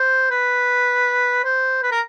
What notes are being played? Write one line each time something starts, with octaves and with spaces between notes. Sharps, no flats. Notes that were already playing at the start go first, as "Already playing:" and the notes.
Already playing: C5
B4
C5
B4
A#4